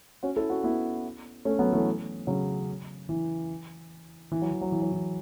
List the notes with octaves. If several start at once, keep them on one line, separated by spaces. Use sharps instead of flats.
C#4 F#4
E4 A4
C#4 F#4
B3 E4
A3 C#4
F#3 B3
E3 A3
C#3 F#3
E3
E3
F#3
E3
F#3
E3
F#3
E3